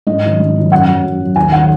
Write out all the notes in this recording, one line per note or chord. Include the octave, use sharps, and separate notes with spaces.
G#2 D#5
D#3 F#3
G#2
D#3 F#3
F#2 F#5
F#3
F#2
F#3
D#2 G#5
D#3 F#3 F#5